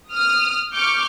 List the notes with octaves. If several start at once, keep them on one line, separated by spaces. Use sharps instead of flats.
D#6 F6
C#6 D6 F6 G6